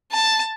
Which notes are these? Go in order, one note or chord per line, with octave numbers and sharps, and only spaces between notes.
A5